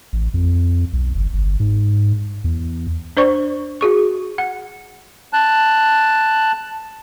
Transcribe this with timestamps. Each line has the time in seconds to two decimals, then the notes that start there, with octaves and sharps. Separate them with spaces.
0.13 A1
0.34 F2
0.93 B1
1.15 G1
1.34 G1
1.60 G#2
2.44 E2
3.17 D4 C5 D5 C#6
3.81 F#4 G#4 C#6
4.38 F#5
5.33 A5 F#6